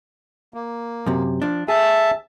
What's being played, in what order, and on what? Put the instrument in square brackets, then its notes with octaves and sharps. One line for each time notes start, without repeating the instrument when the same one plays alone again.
[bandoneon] A#3
[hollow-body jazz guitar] F#2 C3
F3 D4
[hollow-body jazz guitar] G#4 [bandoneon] E5 A5